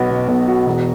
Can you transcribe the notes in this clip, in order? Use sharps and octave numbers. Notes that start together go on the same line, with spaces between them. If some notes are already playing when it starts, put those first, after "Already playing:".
Already playing: B1 B3 F#4
B2
B1
F#4
E1